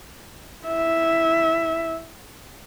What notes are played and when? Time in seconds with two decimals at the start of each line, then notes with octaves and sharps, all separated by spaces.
0.65 E4 E5